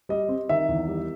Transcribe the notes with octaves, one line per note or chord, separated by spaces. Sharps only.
G3 D#5
C4
D#3 E5
E2
G3